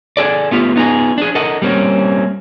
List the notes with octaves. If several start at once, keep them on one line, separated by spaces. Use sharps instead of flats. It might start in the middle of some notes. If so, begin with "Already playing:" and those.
D4 G#4 A4 D5
A3 B3 F4 G4
B3 D#4 F4 G#4
D4 G#4
A4 A#4 D#5 F#5
G3 A#3 C4 C#4